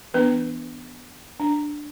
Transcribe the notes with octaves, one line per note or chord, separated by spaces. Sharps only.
E3 B3 D4 B4
D4